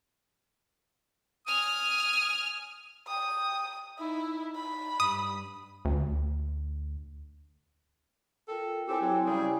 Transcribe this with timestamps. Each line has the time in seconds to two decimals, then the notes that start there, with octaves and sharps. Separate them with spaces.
1.47 G#5 D#6 F6
3.07 G5 D#6
3.99 D#4 E4
4.56 B5
5.00 G2 D#6
5.85 D2
8.48 F4 A4 A#4 G5
8.88 C4 E4 G4 A4 C#5 G#5
9.01 F#3 C4
9.26 C#3 G3 G#4